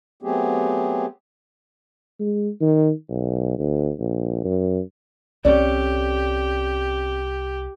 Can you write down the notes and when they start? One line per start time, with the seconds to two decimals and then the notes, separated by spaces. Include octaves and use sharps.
0.23 F#3 A3 B3 C4 G4 G#4
2.20 G#3
2.61 D#3
3.09 B1
3.58 D2
4.00 A#1
4.45 F#2
5.45 C2 C4 C#4 G4 A4 D5